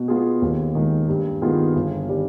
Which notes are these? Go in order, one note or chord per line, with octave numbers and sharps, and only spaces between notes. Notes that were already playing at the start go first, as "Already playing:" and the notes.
Already playing: B2
B3 F4 G#4
D#2
D#3 G#3
G2
D#3 B3 F4 G#4
G1
D#3 G3